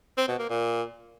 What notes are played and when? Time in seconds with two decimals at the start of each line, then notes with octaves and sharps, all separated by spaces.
0.17 C4
0.28 B2
0.39 A#3
0.49 A#2